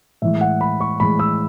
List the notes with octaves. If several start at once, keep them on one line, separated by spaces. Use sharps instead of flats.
A2 E3 G#3 E5
F#5
B5
C#6
A2 E3 G#3 B5
E6